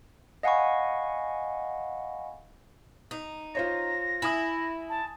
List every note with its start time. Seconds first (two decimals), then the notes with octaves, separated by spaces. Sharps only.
0.43 D#5 F5 F#5 G#5 B5 C#6
3.11 D#4
3.55 F4 C5 C#5 A#6
4.22 E4 G#5 D#6
4.89 A5